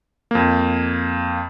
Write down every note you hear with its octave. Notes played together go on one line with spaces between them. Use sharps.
F2 A#3